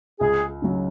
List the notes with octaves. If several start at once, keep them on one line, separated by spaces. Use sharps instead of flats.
C#2 G#4
C#3 F#3